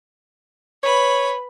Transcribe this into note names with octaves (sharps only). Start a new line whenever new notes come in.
B4 C#5 B5